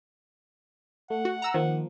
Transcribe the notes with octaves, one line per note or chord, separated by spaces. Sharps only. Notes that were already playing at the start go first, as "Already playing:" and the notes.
A3 F#5
F#4
A#5 E6
D#3 F3 A#3